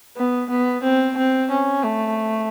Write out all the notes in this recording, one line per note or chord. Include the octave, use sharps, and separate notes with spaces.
B3
B3
C4
C4
C#4
A3